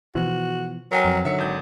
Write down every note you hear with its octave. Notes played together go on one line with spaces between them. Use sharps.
B2 E3 F3 F#4
F#3 A#4 G5 G#5
F2
D3 D#3 F#3 E5 C#7
G#1 G6